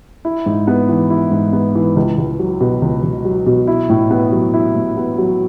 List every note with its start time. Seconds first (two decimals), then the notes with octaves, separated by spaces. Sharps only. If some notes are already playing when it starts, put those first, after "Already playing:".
0.25 E4
0.46 G#2
0.67 B3
0.89 E3
1.10 E4
1.31 G#2
1.53 B3
1.75 E3
1.96 C#2
2.18 C#2
2.39 F#3
2.61 B2
2.82 C#2
3.03 C#2
3.25 F#3
3.46 B2
3.67 E4
3.90 A2
4.10 B3
4.32 F#3
4.54 E4
4.75 A2
4.97 B3
5.18 F#3